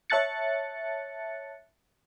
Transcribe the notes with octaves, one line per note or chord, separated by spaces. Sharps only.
C#5 E5 A5 F#6 A6 C#7